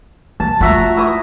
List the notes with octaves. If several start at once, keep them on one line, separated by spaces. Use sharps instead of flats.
F3 A5
A3 F4 F#4 E5 A#5
E4 D#6